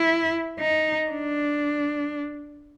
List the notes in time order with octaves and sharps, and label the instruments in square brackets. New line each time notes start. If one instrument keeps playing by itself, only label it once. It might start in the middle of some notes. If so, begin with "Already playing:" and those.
Already playing: [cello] E4
D#4
D4